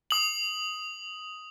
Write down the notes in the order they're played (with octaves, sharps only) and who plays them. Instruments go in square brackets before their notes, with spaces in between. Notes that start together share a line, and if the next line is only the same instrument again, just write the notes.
[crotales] D#6 F#7